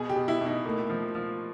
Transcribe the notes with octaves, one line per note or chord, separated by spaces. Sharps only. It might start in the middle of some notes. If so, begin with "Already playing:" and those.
Already playing: B2 G#4
G4
B2
E4
B2
D#4
A3 A#3
F3
F3